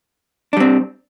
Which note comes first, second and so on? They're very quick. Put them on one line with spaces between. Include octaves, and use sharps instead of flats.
D4 G3 C4